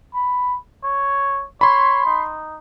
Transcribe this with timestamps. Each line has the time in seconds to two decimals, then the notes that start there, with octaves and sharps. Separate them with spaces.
0.14 B5
0.84 C#5
1.61 C#5 B5 C6
2.05 D#4